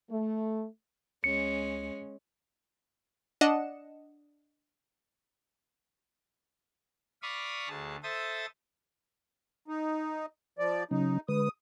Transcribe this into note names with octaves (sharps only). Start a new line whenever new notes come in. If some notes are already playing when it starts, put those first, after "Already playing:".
A3
C#2 G#3 C#4 C#7
D4 D#5 F#5 C#7 E7
D5 F5 B5 C#6 D#6
D2 G#4 A5
A4 C5 E5 D#6 A6
D#4
F3 D5
C#3 F#3 C#4 D#4
D3 G#3 B4 D#6